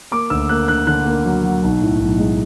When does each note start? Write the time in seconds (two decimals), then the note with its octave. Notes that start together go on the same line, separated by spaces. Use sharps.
0.11 A#3 D6
0.30 D2 E6
0.49 A#3 F#6
0.68 D3 F#6
0.87 D3 F#6
1.06 A#3
1.25 F#3
1.44 F#3
1.63 B1
1.82 A2
2.00 B1
2.18 G#3